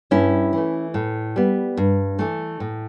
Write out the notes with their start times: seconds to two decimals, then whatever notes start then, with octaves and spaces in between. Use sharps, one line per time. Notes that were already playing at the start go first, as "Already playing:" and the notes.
0.11 G2 C#4 E4
0.53 E3 A3
0.94 A2
1.36 G3 B3
1.77 G2
2.19 E3 A3
2.60 A2